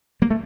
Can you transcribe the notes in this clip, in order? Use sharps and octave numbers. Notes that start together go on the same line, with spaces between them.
G3 A#3
A3